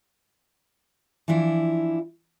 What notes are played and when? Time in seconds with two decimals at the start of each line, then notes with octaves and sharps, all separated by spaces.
1.28 E3 F3 D4 E4 F4